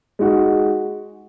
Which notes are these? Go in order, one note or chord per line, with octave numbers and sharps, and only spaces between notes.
G#3 D#4 F#4